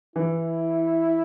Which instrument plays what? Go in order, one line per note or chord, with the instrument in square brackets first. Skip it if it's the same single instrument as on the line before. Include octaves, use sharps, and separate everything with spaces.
[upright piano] E3 [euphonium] E4